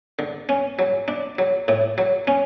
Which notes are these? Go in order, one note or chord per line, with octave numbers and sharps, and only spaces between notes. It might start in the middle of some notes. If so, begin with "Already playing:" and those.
D3
C#4
F#3
D4
F#3
A2
F#3
C#4